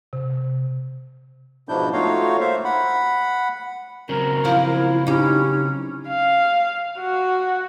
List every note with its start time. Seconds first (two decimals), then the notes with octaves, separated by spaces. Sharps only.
0.13 C3
1.69 G#2 B2 F3 D4 E4 G6
1.93 A3 D#4 F4 F#4 C#5 F5
2.40 A#3 C5 E5 F5
2.65 F#5 B5
4.09 C#3 F#3 C4 A#4
4.45 F3 E4
5.07 C#4 D#4 G4
6.08 F5
6.99 F#4